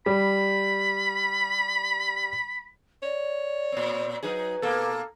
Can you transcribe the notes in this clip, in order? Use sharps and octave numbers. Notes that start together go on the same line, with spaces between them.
G3 B5
C#5 D5
A#2 C4
F#3 D#4 G#4 B4
B2 A#3 A4